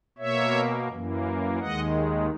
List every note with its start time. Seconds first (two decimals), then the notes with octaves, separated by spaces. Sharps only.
0.18 B2 A#3 C#5 E5
0.89 F#2 E3 A#3
1.59 D#2 D#3 G#3 D#5 F#5